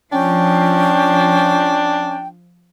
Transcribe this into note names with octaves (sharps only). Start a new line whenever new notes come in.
F3 C#4 D4 G5